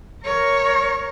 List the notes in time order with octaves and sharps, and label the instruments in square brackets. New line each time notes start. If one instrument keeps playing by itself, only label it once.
[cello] A#4 C#5